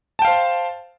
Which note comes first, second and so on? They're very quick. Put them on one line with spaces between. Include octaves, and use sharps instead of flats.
A5 G5 F5 C5